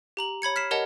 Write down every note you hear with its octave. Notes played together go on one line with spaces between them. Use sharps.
G4 A#5 F#7
C#5 B5 G#6 C#7
F6 B6 C7 E7
G4 A#4 C#5 D#5 F#5 A5